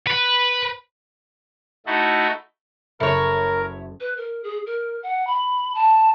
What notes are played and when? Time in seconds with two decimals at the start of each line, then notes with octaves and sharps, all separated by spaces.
0.07 B4
1.86 A3 D#4 E4 F#4 A4
3.00 F#1 E4 A4 A#4 C#5 C#7
4.00 B4
4.17 A#4
4.44 G#4
4.66 A#4
5.03 F#5
5.27 B5
5.75 A5